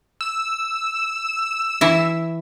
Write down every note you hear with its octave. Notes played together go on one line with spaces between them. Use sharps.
E6
E3 E4 E5